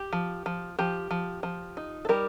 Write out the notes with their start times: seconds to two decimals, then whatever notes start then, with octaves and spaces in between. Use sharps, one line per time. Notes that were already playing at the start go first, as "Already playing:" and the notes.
Already playing: G4
0.13 F3
0.46 F3
0.79 F3 G4
1.11 F3
1.43 F3
1.77 D#4
2.05 A4
2.09 G3 G4 A#4